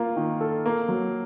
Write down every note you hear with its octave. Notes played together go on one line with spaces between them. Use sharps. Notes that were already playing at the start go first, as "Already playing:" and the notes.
Already playing: A#3 F4
D#3
A4
A#3
F#3